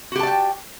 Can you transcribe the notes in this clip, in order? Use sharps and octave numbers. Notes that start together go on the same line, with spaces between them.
F#4 G4 D5 G5 A5